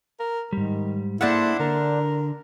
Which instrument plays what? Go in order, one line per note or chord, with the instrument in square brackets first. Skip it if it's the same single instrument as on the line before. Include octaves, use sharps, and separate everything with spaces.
[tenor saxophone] A#4
[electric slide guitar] G#2 G3 [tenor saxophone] D#3
[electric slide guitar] A#3 G#4 A4 [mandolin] D4 C5 F#5 [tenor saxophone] E4
[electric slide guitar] D3 [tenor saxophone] A#4